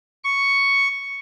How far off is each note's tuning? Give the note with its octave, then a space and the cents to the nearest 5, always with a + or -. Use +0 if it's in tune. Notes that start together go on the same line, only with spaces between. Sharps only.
C#6 +0